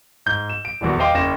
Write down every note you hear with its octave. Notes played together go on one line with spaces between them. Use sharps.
G#2 G6
E7
D7
D#1 A#1 E2 F#4
C5 D#5 F5 G5 C6 D6
F#1 C#4 G5 A#6 E7